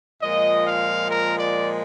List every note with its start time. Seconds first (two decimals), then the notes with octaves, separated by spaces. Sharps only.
0.22 A#2 F3 G#3 D#5
0.66 F5
1.10 A#4
1.39 D5